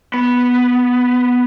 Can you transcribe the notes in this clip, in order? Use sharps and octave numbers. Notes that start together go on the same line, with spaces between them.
B3